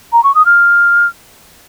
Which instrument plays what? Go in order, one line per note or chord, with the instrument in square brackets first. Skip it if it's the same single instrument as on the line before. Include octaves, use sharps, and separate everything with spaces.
[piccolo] A#5
C#6
D#6
F6